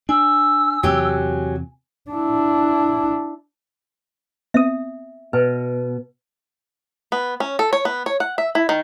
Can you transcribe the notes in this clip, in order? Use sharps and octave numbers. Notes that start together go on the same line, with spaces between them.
D4 G#5 E6
E2 C3 F#3 G4
D4 E4
B3 C4 E5 D#6
B2 B4
B3
C#4
A4
C#5
B3
C#5
F#5
E5
E4
D#3